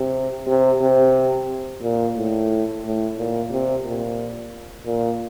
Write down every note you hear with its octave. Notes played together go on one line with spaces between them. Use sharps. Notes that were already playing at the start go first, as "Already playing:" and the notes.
Already playing: C3
C3
C3
A#2
A2
A2
A#2
C3
A#2
A#2